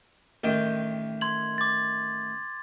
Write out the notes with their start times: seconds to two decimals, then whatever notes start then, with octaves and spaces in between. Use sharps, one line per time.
0.44 A1 D#3 G5
1.21 C6 G#6 F#7
1.58 D6 A6